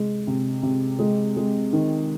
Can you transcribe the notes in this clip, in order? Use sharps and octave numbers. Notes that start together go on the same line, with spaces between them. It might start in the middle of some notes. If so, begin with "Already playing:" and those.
Already playing: C3 G#3
C3
C3
G#3
G#3
D#3